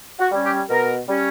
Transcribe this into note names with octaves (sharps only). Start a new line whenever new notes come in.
F#4
G3 C#4
G4
B2 A#4
G3 C#4